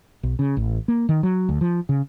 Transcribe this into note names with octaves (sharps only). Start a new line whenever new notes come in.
B1
C#3
A1
A#3
D#3
F#3
D2
F3
C#3